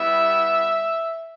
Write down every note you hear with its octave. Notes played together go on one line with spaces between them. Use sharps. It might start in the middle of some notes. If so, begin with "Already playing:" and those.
Already playing: G3 B3 E4 G4 E5